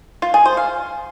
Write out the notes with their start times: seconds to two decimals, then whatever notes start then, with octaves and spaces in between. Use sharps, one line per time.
0.22 F4
0.34 G#4
0.46 C5
0.57 F5